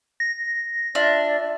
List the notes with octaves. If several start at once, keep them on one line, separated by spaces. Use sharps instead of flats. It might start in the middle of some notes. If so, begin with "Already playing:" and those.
A#6
D4 F4 D5 E5